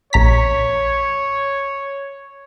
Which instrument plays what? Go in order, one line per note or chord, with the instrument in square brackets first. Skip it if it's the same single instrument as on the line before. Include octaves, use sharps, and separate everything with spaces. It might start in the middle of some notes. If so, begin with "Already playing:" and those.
[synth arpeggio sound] A#1 A#5 B6 [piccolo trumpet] C#5